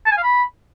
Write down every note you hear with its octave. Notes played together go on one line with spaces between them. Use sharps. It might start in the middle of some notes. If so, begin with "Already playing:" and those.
A5
G#5
F5
B5